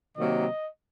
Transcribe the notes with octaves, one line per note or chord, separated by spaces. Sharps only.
C3 D#3 F#3 A#3 D#5